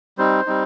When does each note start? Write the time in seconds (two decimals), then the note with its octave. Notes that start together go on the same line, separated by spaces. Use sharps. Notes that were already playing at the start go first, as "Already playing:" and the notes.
0.18 G3 C4 D#4 C5
0.46 G3 C4 D#4